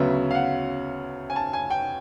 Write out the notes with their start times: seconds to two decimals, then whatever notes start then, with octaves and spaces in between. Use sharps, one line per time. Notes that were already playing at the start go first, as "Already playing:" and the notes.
Already playing: D2 C#3 F#3 B3 E5
0.31 F5
0.35 F#5
1.30 G#5
1.36 A5
1.53 G#5
1.70 G5